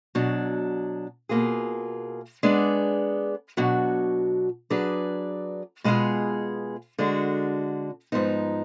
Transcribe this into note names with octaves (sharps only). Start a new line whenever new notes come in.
B2 F#3 D4
B2 A#3 F4 G#4
G#3 B3 D4 G#4 D5
B2 F#3 D4 F#4
F#3 D4 G#4 B4 D5
B2 G#3 B3 F4 G#4
D3 G#3 D4 F#4
G#2 F3 B3 D#4